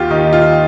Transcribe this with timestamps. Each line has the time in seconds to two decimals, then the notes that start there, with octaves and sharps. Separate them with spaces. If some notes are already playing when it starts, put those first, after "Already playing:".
Already playing: D#2 F4 G4
0.11 D#3 D#4
0.33 F4